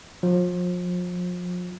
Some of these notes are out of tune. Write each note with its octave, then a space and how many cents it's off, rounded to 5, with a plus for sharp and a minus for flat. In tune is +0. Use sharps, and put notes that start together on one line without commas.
F3 +35